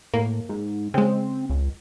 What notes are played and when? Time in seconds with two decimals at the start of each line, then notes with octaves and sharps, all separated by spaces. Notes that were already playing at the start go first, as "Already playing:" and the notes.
0.14 A2 A#3
0.49 G#2
0.94 C#3 G#3 C4
1.50 C#2